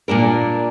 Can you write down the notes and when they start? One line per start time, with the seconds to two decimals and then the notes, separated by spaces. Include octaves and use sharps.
0.08 A#2 A#3 D4 A#4